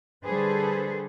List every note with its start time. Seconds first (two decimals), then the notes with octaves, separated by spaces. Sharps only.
0.24 D3 G3 G#4 A4 B4 C5